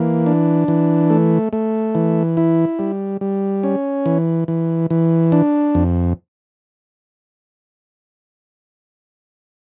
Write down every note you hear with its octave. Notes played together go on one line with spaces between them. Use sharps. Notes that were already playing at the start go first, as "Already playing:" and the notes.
Already playing: E3 A#3
D4
E3
A3
A3
E3
E4
G3
G3
C#4
E3
E3
E3
D4
F2